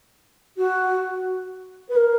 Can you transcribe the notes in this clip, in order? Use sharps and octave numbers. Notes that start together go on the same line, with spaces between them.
F#4
B4
A#4